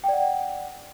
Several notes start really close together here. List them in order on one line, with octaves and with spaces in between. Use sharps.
G5 D5 F#5